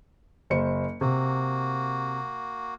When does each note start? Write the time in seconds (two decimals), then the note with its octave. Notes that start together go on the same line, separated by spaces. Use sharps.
0.50 F#1 C5 C#7
1.01 C3 A#3 F#4